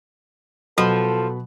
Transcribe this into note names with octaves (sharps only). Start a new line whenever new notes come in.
B2 F3 F#3 A4 F#5 B5